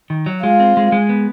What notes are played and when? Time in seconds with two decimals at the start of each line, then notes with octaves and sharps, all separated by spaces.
0.10 D#3
0.26 F#3
0.43 G#3 F4
0.60 C4
0.77 G#3
0.92 G#3
1.09 B3